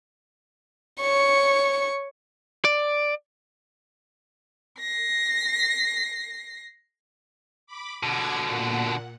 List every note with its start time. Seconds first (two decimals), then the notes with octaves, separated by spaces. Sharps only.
1.01 C#5 C#6
2.65 D5
4.79 A#6 C7
7.67 B5 D6
8.03 B2 D3 F#5 D6 G#6
8.44 A#2 F#5